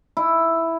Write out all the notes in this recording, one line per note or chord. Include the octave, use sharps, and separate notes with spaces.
E4